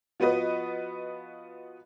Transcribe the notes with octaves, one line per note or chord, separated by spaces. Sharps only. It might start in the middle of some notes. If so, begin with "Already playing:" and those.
F3 B3 F#4 B4 D#5